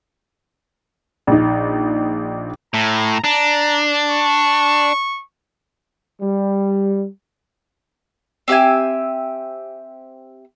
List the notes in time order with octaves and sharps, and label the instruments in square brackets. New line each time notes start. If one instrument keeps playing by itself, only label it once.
[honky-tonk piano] A#1 D#4
[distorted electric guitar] A2 [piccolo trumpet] A#5
[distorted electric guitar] D4 [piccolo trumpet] A#5
[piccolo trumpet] C#6
[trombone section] G3
[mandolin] C4 G4 E5 G#5